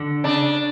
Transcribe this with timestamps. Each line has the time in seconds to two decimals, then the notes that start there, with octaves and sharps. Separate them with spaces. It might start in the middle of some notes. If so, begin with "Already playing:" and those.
Already playing: D3
0.24 C#3 D4